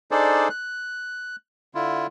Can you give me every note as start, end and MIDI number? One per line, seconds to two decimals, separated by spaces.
0.11 0.48 62
0.11 0.48 63
0.11 0.48 68
0.11 0.48 69
0.11 0.48 72
0.11 0.48 74
0.50 1.36 90
1.75 2.07 50
1.75 2.07 64
1.75 2.07 65